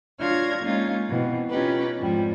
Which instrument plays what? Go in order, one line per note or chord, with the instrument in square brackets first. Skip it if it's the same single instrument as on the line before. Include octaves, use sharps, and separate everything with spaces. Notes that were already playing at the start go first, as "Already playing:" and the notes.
[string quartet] D4 F4 C#5 F6 G#6 A#6
G#3 A#3 C#4 D#4 F4
B2 E3 C4
B3 C#4 D#4 F4 G4 B4
F2 G#2 F3 G3